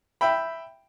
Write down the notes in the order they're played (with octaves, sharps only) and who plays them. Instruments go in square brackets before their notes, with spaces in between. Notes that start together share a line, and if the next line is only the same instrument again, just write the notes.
[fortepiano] E5 G5 B5